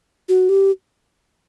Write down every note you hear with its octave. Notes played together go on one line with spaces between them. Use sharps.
F#4
G4